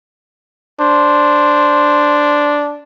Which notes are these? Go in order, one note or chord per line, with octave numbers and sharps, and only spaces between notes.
D4 C5